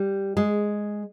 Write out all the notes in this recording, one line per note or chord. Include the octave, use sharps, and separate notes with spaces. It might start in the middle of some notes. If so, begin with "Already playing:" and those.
Already playing: G3
G#3